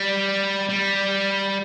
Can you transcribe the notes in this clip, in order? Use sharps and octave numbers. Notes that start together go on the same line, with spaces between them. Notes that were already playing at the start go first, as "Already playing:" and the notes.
Already playing: G3
G3